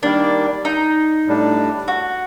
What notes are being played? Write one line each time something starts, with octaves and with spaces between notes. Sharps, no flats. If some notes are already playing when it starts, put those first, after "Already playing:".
D#3 G3 A#3 D4
D#4
A2 G3 D4
F#4